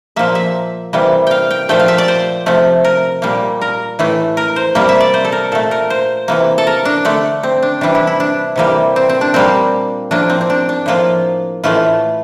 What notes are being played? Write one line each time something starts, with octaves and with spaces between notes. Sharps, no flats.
A#2 F3 A#3 E5
E5
C3 E3 G3 A#3
F5 G5
G5
A#2 F3 A3 G5
F5
E5
D5
C5
C3 F3 A3
A#4
A#2 G3 A#3
A#4
A2 E3 A3
A#4
C5
C3 G3 A#3
E5
D5
C5
A4
A#4
A#2 A3 A4
A#4
C5
C3 E3 A#3
A4
A#4
D4
D3 A3
C4
D4
C3 E3 G3 D4
E4
E4
D4
C3 E3 G3 A#3
C4
C4
D4
A#2 G3 A#3 C4
A2 F3 A#3 D4
C4
C4
D4
D4
A2 F3 A#3 F4
A2 E3 A3 F4